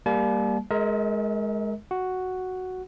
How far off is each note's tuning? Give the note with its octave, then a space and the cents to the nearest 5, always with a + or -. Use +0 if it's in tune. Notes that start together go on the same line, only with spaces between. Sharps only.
G3 +15 A#3 +0 A5 -45
G#3 +10 A#4 +0 E5 -45
F#4 +0 F#5 +0